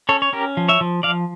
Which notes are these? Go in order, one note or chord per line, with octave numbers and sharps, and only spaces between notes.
C#4 A4 C#5
C#5
C#4 G4 A#4
F3
C#5 E5
F3
F3 D5 F5